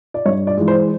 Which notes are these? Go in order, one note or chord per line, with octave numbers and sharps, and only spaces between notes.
D5
G2 C#5
D5
E3 G#3
C5